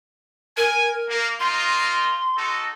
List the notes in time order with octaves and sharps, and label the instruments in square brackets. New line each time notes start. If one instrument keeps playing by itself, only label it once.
[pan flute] A#4 [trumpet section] G#5
[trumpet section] A#3
[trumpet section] A#3 D#4 F4 [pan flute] C6
[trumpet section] D#4 F#4 A4